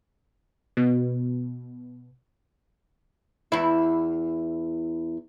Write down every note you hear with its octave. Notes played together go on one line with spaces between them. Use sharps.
B2
E2 E4